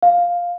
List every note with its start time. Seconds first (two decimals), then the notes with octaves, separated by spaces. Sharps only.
0.03 F5